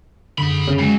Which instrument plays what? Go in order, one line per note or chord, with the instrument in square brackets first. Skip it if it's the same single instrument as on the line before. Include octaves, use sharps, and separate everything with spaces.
[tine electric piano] F#2 D3 [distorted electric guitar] G#4 B5
[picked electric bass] C#3
[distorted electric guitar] F#3 [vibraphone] G#3